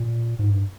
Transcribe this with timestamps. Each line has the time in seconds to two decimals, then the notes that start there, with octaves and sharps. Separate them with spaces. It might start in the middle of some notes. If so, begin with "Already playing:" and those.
Already playing: A#2
0.39 G#2
0.50 G2